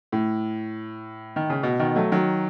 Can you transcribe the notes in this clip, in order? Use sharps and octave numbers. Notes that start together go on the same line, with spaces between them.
A2
D#3
C#3
B2
B2 D#3
F#3 A3
D#3 F#3